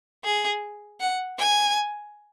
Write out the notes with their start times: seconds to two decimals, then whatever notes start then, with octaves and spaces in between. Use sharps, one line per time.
0.24 G#4
1.00 F#5
1.39 G#5